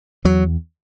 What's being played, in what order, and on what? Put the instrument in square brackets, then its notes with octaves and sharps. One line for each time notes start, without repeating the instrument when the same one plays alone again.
[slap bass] E2 F#3